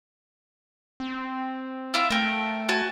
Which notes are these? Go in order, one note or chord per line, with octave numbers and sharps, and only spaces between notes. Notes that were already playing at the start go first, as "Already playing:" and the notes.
C4
E4 F4 E5
A3 A#4 G5
F#4 G#5 A5